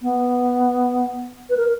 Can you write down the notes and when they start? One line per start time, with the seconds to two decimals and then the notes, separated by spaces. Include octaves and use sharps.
0.02 B3
1.50 B4
1.57 A#4